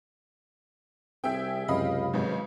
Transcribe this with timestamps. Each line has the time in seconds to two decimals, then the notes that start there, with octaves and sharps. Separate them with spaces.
1.24 C2 C4 G#4 E5 G5
1.68 C#2 F#2 C3 D#5 F5 B5
2.14 G#1 G#2 C#3 F#3 G#3 C4 B4